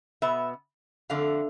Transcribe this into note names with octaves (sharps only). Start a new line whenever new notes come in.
B2 B3 E5
F2 D3 A3 F5